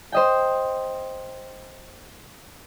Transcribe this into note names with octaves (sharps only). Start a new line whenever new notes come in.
C5 D#5 G5